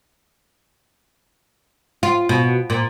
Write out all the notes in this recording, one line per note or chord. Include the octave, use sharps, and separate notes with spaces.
F4
B2
A#2